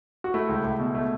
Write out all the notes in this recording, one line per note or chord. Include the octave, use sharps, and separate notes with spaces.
F#4
A3 E4
C#2
C#2
B2
A3